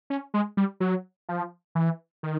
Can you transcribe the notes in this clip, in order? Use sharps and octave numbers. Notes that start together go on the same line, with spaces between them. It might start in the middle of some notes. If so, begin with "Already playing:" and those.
C#4
G#3
G3
F#3
F3
E3
D#3